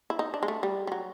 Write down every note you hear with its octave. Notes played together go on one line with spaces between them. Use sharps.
E4
D#4
D4
G#3
A3
G3
G3
F#3